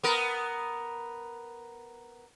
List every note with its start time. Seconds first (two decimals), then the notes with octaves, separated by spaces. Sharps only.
0.03 B3 A#4